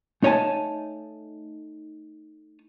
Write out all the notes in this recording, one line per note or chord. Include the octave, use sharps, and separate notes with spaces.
A3 D#4 C#5 D#5 G#5 A5